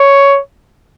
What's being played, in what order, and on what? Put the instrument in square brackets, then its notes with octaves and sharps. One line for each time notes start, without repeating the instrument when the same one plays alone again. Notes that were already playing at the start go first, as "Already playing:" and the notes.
Already playing: [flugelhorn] C#5